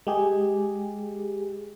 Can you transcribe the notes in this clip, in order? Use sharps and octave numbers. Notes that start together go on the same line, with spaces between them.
G#3 G4 G#4